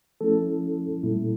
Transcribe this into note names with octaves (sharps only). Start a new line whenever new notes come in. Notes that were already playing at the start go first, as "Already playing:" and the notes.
F3 A3 C#4 E4 A4
A#2 G3 A#3 E4